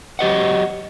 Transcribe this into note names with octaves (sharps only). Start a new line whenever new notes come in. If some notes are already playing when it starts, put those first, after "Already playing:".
F#3 G4 D#5 F#5